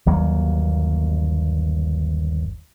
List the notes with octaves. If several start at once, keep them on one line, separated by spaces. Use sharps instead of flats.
G1 D#2 F#3 A#3